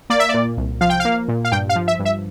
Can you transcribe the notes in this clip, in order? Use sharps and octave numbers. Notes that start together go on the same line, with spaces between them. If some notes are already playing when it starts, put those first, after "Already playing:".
A#3 D5
E5
A#2 D5
C2
F3 F5
G5
F5
A#3
A#2
F5
G2 G5
F5
F3
E5
G2
E5